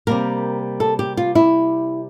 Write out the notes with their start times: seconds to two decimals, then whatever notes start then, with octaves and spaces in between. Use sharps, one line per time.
0.07 C3 G3 A#3 A#4
0.80 A4
0.99 G4
1.17 F4
1.35 E4